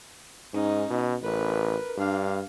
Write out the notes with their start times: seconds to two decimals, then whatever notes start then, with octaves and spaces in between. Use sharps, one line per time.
0.53 G#2 C#4 D#4
0.90 B2
1.23 A1 A#4 B4
1.98 G2 D4 F5